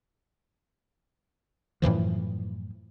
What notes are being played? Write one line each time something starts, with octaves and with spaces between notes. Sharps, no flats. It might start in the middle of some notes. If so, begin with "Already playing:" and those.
F#2 A2 E3 F3